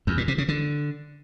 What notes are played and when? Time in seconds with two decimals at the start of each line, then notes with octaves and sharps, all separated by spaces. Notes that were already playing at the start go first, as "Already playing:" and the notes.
0.07 E2
0.17 A#2
0.28 C3
0.38 C#3
0.48 D3